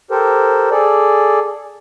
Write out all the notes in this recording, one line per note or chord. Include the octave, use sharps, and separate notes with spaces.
G4 A4 A#4 C5
G#4 A4 D5